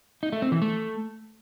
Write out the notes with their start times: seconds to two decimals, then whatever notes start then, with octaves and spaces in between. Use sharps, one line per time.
0.23 D#4
0.32 A3
0.42 C4
0.52 E3
0.62 A3